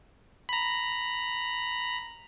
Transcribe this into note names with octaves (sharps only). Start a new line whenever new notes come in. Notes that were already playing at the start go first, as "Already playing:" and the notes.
A#5 B5